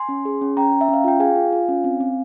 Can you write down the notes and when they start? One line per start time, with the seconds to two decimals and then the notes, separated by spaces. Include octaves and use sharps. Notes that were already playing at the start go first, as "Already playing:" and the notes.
Already playing: G#5 C6
0.09 C#4
0.25 G#4
0.42 C#4
0.57 C#4 G5 A#5
0.73 C#4
0.81 E5
0.89 C#4 F5
1.04 F4 G5
1.20 G#4 F5 G#5
1.36 F4
1.52 F4
1.69 C#4
1.84 C4
2.00 C4